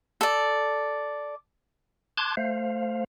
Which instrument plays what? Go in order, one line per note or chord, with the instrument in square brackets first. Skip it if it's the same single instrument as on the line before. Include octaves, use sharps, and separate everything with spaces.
[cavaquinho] A4 D5
[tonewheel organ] A5 C6 D6 F#6 G#6
A3 C5 F5